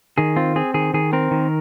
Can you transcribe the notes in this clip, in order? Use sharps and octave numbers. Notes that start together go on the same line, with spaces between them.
D#3 G#4
C4 F4
C4 G#4
D#3 G#4
D#3 G#4
C4 A#4
D#3